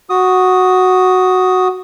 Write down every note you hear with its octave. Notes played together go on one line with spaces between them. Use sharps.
F#4 D#6